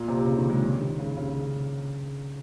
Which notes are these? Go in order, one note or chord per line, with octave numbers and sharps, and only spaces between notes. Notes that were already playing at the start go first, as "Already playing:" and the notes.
Already playing: A#2
C3
C#3
D#3
G#3
D#3
C#3
C#3